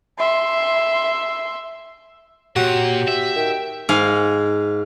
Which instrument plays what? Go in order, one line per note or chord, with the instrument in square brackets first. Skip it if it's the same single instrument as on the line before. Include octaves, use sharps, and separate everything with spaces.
[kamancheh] E5 C6
[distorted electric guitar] A#2 [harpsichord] F#4 [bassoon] G4 [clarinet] C#5
[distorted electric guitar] E5
[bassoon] D#3 [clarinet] G5
[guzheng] G#2 F5 G#5